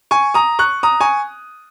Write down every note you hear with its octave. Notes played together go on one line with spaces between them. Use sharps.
G#5 C#6
A#5 D#6
C#6 F#6
A#5 D#6
G#5 C#6